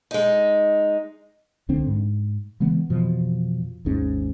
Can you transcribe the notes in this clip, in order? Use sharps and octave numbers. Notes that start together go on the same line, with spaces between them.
G#3 D#4
C2 D3 C4 D4
G#2 G#3
C#3 E3 G#3 B3
F2 B2 E3 F3
G#1 D#2 G#2 C#4